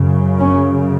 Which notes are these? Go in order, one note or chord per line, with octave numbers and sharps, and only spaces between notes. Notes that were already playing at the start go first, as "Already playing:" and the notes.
Already playing: F#2 C#3
C#4